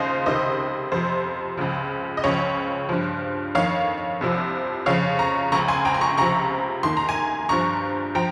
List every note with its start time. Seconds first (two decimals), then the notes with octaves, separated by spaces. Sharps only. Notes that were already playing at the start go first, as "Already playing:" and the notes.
Already playing: D#2 C#3 F3 C5 D#5 F5
0.26 C#2 C3 D#3 C5 D#5
0.92 F2 C3 F3 C5
1.57 C#2 C#3 F3
2.17 D#5
2.24 C#2 C#3 F3 C#5
2.89 G2 F3
3.55 F2 D#3 C#5 F5
4.21 C2 C3 F3
4.86 F2 C#3 F3 C#5 F5
5.19 A#5 C#6
5.52 C#2 C#3 F3 A#5 C#6
5.68 G#5 C6
5.85 G5 A#5
5.94 C6
6.01 A#5 C#6
6.17 C#2 C3 F3 A#5 C#6
6.83 D#2 D#3 C6
6.97 A#5
7.09 G#5 C6
7.49 G2 F3 A#5 C#6
8.15 F3 G5 A#5